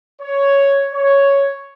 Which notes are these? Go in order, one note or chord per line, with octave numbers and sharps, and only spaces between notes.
C#5
C#5